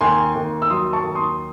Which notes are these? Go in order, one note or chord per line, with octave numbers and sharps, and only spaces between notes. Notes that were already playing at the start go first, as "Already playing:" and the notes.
D#2 G#5 C6
D#2
E6
F#3 C6 D#6
A5 C#6
D#2
C6 D#6